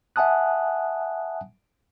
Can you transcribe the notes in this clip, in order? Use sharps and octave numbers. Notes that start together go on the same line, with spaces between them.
E5 F#5 G#5 A5 D#6 F#6